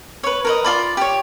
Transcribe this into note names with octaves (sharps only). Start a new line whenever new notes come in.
B4 C#5
A#4 B4 D#5
F4 D5 B5
G4 C#5